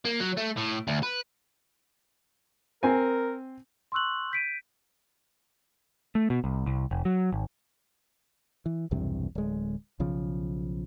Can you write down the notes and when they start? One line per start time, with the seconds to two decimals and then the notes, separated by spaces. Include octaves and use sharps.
0.05 A#3
0.20 F#3
0.37 A3
0.57 A2
0.87 D2
1.03 B4
2.83 C4 A#4 C5 G#5
3.92 C6 C#6 E6 F#6 F#7
4.32 G6 B6 D7 D#7
6.15 A3
6.30 B2
6.44 C2
6.66 C2
6.91 F1
7.05 F#3
7.33 G#1
8.66 E3
8.91 B1 E2 G2 C3
9.35 D1 G#3
10.00 B1 C#3 F3